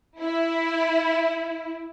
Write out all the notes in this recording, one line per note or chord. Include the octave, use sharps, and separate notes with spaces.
E4